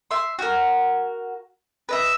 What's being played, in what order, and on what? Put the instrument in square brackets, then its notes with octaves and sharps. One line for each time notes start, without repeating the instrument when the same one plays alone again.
[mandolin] E5 C6
F#4 A#4
B4 D#5 E5